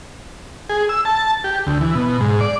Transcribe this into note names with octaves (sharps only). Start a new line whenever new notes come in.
G#4
E6
A5
G4
D2
E3
B2
G#2
D5